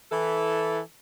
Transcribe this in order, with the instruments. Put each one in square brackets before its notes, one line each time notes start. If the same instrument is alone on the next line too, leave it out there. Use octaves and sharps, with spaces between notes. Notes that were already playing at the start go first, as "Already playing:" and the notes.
[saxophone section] E3 A4